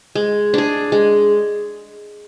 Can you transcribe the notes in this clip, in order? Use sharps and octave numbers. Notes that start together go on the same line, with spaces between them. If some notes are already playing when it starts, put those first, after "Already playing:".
G#3
D4 G#4
G#3